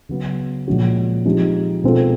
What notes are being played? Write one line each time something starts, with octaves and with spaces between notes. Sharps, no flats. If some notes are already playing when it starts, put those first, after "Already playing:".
C#3 F#3 B3
A#2 F3 G#3 C#4 F#4
F3 G#3 C4 D#4 G4
B2 G#3 C4 F4 A4